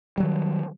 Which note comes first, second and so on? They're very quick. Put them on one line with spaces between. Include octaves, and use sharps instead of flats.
G3 F#3 D#3